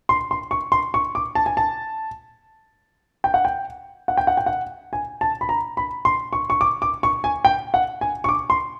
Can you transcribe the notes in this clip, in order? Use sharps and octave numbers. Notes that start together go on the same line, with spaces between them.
C6
C6
C#6
C6
C#6
D6
A5
G#5
A5
G5
F#5
G5
F#5
G5
F#5
G5
F#5
G#5
A5
B5
A#5
B5
C6
C#6
C#6
D6
D6
C#6
G#5
G5
F#5
G#5
C#6
D6
C6